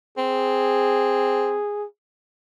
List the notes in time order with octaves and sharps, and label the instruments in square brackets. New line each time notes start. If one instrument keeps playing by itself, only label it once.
[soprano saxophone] C4 [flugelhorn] G#4